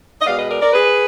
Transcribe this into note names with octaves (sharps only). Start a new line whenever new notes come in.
D#5
B2 G#3 B3 D5 F5
B4 D#5
A#4 D5
A#4 D5
G#4 B4